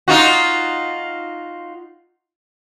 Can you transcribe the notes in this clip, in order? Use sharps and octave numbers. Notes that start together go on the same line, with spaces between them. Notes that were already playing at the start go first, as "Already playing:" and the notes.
D#4 F4 F#4